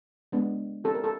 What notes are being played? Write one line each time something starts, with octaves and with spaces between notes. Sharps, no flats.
G#3 B3 D4
C4 E4 G4 A4
A#4
A4